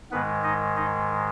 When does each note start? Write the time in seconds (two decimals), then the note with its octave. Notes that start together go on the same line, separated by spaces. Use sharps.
0.11 G#2 D#3 G#3 B3 B4
0.44 D#4 D#5
0.76 D#4 D#5